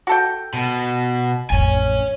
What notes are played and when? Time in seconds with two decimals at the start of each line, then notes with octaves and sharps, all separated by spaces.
0.07 F#4 A4 G5
0.53 B2
1.50 A1 F2 C#5 G#5